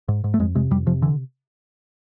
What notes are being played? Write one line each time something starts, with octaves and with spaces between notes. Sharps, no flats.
G#2
G#2
A3
F2 G#3
C3 G#3
F2 G3
C3 F3
D3 E3